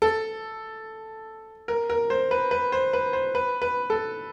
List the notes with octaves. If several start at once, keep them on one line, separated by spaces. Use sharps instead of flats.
A4
A#4
A#4
C5
B4
B4
C5
B4
C5
B4
B4
A4